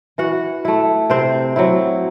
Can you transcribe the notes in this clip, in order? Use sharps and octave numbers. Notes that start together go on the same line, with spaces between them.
E3 F#4 F#5
A3 E4
C3 C4 C5
F#3 C4 E4